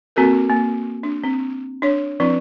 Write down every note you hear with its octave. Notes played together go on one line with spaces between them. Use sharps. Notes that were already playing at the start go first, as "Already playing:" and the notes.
A#3 C4 F#4 A4 A#4
A#3
D4
C4
D4 C#5
F3 C4 D4 E4 B4